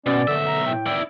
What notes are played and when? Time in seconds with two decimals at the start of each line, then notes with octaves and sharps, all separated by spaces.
0.06 B2 C#4 D5
0.27 B1 D3 E5
0.47 A#5
0.67 A2 G5
0.86 E4 D5